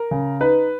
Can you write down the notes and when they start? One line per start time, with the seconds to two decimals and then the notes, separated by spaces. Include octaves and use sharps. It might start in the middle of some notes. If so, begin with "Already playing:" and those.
Already playing: A#4
0.11 C#3
0.40 D#4 B4